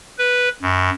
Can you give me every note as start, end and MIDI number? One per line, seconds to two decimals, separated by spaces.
0.18 0.49 71
0.62 0.90 42